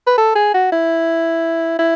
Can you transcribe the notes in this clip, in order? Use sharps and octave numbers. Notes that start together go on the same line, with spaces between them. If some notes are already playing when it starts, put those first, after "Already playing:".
B4
A4
G#4
F#4
E4
E4